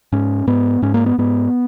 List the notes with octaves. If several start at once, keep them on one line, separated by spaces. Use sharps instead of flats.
G#2 C#4
G#2 B3
G#2 C#4
A#3
B3
G#2 B3